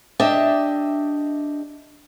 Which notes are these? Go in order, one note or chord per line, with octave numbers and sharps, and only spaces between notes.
D4 G4 D#5 E5